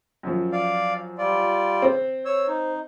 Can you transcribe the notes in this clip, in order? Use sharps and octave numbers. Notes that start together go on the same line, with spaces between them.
F#2 F3
D5 F5
G3 F4 D5
C4
C#5 E6
D#4